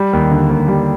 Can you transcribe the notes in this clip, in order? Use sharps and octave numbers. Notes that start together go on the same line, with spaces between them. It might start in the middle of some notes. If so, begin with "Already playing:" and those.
Already playing: G3
D#2
D3
D#2
G3